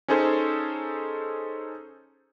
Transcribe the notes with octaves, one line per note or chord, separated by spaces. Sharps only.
C#4 D#4 G#4 A4 C5 C#5